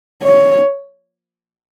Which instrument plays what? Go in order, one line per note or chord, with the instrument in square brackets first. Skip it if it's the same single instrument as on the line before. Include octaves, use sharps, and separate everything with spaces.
[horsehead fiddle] C#5